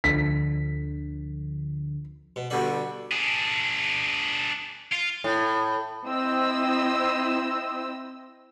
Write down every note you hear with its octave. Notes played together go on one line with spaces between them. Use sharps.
D2 D3 F3 B6
B2
B2 D3 G3 F#4
D4 G#4
F4
A2
C4 E4 D#5 E6